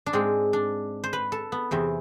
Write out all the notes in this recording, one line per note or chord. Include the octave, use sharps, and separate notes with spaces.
D4
G#2 G#3 C4
D4
C5
B4
A4
B3
E2 C3 E3 C4